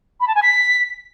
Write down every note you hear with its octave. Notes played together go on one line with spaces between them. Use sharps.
B5
A5
G#5
B6